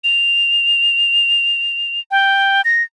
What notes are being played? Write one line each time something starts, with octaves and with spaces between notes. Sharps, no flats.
F7
G5
A#6